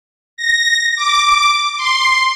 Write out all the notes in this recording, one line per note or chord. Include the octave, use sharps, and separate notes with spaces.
A#6
D6
C6